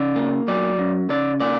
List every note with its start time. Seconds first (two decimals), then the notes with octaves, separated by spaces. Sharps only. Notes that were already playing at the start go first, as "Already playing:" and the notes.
Already playing: C#3 D5
0.16 A#3
0.48 F#3 D5
0.78 F#2
1.10 C#3 D5
1.40 A#3 D5